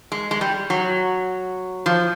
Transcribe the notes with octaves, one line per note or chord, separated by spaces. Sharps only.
G#3
G#3
G3
F#3
F3